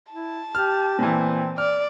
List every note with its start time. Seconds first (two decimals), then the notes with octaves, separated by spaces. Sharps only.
0.12 E4 A5
0.55 G4 F6
0.99 A#2 E3 C4
1.58 D5 F6